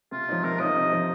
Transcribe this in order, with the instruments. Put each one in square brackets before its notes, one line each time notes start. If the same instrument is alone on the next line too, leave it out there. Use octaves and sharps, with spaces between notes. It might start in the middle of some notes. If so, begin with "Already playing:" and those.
[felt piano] C3 [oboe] F4
[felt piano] F3 D#4
[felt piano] C3 [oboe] A#4
[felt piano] F3 D#4 [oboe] D#5
[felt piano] C3
F3 D#4